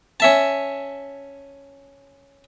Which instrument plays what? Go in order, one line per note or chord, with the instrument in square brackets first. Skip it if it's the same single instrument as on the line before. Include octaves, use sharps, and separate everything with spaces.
[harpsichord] C#4 E5 A5